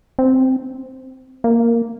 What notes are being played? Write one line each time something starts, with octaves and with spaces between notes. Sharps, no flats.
C4
A#3